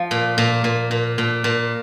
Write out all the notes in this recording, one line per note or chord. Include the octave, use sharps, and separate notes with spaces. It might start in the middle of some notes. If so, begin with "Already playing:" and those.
Already playing: F3
A#2
A#2
A#2
A#2
A#2
A#2